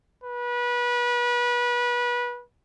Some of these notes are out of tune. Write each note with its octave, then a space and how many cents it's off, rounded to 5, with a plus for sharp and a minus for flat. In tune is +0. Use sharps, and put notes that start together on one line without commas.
B4 -25